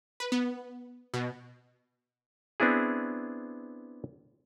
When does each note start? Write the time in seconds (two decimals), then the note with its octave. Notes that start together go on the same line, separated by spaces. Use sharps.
0.20 B4
0.32 B3
1.14 B2
2.60 B3 C4 D4 E4 G#4